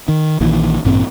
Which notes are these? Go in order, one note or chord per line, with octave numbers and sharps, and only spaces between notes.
D#3
A#1 A#2 D#3 E3
A1 G2 A#2 C4